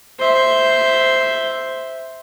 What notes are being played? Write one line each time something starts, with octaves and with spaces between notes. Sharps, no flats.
C5 E5